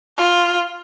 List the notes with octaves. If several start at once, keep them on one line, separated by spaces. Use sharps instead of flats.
F4